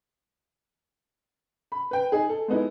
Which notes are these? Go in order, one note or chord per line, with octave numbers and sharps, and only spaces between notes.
B5
B4 G5
D#4 G#4
A4
G#3 B3 D#4 E4